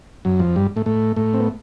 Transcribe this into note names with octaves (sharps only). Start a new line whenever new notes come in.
F#2 F#3
F2 F3
G2 G3
A2 A3
A2 A3
A2 A3
C4
B3